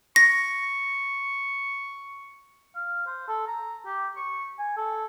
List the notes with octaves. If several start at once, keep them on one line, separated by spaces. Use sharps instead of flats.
C#6 A#6
F5
C5
A4
A#5
G4
C#6
G#5
A4